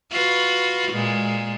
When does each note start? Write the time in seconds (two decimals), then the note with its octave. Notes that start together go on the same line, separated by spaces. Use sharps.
0.12 F4 F#4 B4
0.92 A#2 G#3